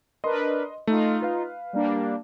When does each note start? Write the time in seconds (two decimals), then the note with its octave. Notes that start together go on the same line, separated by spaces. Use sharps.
0.24 D4 A#4 B4 D#5 C6
0.87 A3 D#4 F4
1.22 B4 F5
1.73 G3 A#3 D4